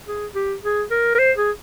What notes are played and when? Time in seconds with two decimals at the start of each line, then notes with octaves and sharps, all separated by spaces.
0.07 G#4
0.35 G4
0.63 G#4
0.91 A#4
1.15 A#4
1.19 C5
1.37 G#4